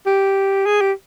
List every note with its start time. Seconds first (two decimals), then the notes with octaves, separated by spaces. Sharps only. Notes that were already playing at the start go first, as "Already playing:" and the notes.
0.06 G4
0.66 G#4
0.81 G4